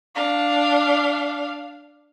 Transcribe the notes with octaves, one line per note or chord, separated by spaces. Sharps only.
D4 F5